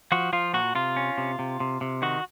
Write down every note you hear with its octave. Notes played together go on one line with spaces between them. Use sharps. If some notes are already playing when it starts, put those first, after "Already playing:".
F3 F#4
F3 F4
A#2 F#4
C3 F4
C#4
C3
C3
C3
C3
D#3 F#4